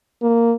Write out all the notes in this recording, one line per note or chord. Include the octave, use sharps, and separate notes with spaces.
A#3